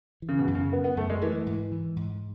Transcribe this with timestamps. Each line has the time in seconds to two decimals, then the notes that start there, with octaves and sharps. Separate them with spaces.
0.22 E3
0.29 C#3
0.39 B2
0.47 F#2
0.55 C#3
0.72 C#3 B3
0.84 B3
0.97 F#2 A3
1.10 G#3
1.21 E3 A3
1.46 G#2
1.72 E3
1.96 G#2